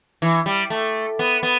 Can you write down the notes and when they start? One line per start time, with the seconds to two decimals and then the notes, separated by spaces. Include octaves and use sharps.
0.22 E3
0.46 G3
0.70 A3
1.19 B3
1.43 B3